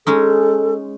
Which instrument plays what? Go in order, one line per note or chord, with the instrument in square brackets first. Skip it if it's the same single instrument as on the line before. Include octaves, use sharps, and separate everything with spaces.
[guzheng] G#3 C#4 D#4 [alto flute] A4